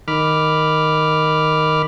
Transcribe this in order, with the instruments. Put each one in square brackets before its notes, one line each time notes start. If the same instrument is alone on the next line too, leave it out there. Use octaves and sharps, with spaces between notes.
[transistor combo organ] D#3 B5 D6 F6